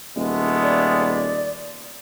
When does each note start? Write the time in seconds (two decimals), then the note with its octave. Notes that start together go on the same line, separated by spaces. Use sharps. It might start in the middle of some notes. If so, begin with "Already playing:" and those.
0.16 D#1 G#3 A3 B3
0.63 D5